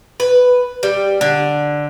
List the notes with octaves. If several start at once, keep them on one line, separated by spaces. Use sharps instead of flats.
B4
G3
D3